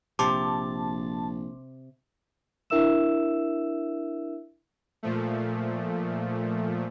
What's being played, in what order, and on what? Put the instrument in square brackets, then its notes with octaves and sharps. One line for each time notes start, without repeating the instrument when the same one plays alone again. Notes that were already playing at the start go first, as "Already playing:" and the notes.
[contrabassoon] A#1 [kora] C3 [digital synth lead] A5 [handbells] C6 D6
[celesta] D4 E4 A#4 E5 E6 E7
[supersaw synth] A#2 F3 A3